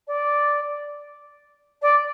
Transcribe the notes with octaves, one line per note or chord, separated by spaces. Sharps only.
D5
D5